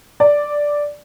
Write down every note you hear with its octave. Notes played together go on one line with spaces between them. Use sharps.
D5